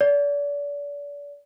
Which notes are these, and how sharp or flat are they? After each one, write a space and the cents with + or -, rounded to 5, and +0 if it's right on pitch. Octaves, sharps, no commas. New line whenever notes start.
D5 -35